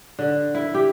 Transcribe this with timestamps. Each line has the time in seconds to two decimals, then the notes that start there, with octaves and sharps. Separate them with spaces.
0.19 D3
0.55 E4
0.74 G4